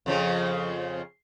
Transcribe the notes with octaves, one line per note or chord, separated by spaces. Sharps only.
F2 C#3 F3